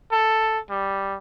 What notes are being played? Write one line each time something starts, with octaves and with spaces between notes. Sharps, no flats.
A4
G3